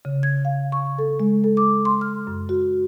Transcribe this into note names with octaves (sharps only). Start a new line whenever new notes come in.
C#3
G#6
F5
C#6
A4
G#3
A4
D6
C6
F6
F#2
F#4